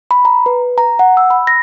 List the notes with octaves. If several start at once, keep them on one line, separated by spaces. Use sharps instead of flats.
B5
A#5
B4
A#5
F#5
E6
B5
A#6